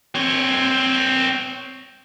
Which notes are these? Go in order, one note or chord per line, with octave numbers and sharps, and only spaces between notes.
C4 C#5